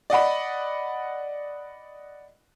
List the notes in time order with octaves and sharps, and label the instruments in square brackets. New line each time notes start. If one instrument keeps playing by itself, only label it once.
[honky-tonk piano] D5 D#5 F#5 B5